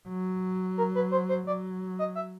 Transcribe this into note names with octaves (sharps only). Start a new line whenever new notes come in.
F#3
A#4
B4
C5
C5
F#3 D5
D#5
E5